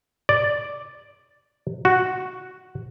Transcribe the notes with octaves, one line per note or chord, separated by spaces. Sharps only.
D5
F#4